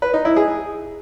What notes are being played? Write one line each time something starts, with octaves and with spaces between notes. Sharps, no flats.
B4
D#4
E4
G#4